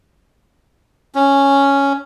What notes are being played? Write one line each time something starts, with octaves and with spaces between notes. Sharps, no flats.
C#4